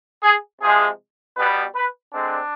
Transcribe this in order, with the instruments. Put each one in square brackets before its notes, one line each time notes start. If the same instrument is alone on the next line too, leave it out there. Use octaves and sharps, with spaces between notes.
[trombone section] G#4
C3 F3 G#3 G#4
B2 G3 B3 B4
B4
D3 G#3 C4 D4